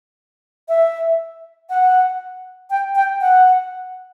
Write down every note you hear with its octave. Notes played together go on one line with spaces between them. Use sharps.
E5
F#5
G5
G5
F#5